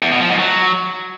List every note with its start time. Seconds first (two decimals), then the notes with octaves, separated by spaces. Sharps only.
0.02 E2
0.11 B2
0.21 F3
0.30 G#2
0.39 F#3